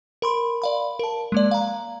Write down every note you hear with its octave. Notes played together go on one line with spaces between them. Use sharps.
A#4 B5 C6
D5 F5 B5
A#4 A5
G#3 A#3 D5
F5 A#5